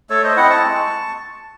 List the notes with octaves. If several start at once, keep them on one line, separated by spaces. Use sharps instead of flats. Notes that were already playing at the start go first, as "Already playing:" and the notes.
A3 A4 C#5
C5 D#5
C4 E4 D#5 F#5
A5 C#6
G#3